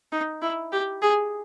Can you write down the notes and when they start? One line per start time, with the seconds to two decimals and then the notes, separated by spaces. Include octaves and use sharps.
0.12 D#4
0.42 E4
0.72 G4
1.02 G#4